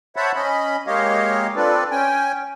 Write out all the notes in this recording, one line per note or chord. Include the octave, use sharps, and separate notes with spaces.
C5 C#5 E5 F#5 A5 B5
C#4 D#5 B5
G#3 A#3 G4 C#5 D#5 F5
C4 D4 F4 A4 B4 D5
C#4 G5 G#5